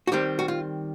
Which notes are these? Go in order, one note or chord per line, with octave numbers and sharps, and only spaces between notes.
F#4
D#3 G3 C4 G4
F#4
F4